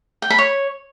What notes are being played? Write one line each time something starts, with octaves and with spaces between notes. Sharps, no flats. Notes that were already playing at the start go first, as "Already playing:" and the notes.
G5
B5
C#5